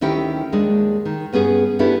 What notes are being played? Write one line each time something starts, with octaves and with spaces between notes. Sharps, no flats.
D2 D#3 C#4 E4 G4 G5
D#2 G#3 D4
D#3
G2 B3 C#4 G#4
B3 C#4 D4 E4 G4 A4